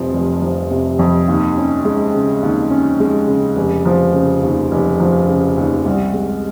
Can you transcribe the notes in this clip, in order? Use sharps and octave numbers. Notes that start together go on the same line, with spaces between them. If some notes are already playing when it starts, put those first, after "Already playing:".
Already playing: F1 F2 C3 F3
F1
F3
C3
F2
D#2
C#4
G#3
C#3
D#2
C#4
G#3
C#3
F1
F3
C#3
D#2
F1
F3
C#3
D#2
C2
G#3